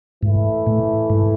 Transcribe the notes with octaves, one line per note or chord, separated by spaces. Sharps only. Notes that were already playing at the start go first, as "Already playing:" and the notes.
G#2 E3 A3 E4
A2
G#2